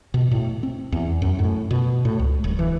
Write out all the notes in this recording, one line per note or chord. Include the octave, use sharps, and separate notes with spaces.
B2
A2
C4
E2
F#2
A2
B2
A2
C#2
D1
E3